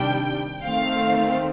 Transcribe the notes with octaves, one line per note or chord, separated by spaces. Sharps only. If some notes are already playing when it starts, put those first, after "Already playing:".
Already playing: C3 D#3 G3 D4 G5
D#3 A3 C4 F5